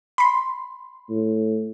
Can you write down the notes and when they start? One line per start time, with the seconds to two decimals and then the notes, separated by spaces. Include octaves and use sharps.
0.18 B5 C6
1.10 A2